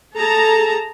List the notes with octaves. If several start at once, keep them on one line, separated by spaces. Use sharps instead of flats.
G#4 A4 A5 A#5